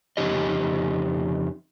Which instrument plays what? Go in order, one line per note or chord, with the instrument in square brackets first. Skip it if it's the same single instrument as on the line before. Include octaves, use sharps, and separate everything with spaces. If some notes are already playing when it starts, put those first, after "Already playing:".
[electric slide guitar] F2 C#3 G#3 D#4 G4 D#5